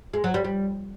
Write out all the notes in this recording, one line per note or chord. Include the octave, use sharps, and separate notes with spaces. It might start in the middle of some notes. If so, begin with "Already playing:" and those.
G#3
F#3
G3
G3